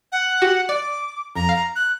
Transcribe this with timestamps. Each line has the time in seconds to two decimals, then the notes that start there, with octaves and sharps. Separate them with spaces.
0.12 F#5
0.42 F#4 G4
0.69 D5 D6
1.35 F2 A#5
1.49 F5
1.76 F#6